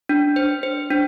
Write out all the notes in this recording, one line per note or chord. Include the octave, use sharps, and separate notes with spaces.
D4
C5
C5
D4